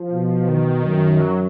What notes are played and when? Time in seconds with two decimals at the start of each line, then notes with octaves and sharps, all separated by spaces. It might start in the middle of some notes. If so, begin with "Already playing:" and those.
Already playing: F3
0.12 B2
0.48 D#3
0.84 F#2
1.21 F#3